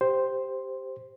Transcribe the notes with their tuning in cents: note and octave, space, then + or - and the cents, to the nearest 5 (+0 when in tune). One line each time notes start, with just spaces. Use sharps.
G4 +0 C5 +0